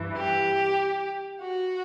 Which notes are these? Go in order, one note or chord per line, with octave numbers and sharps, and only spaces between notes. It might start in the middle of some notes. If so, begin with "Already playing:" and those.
Already playing: G2 E3
G4
F#4